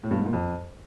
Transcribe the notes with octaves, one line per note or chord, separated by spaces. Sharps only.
A2
G2
G#2
A#2
F2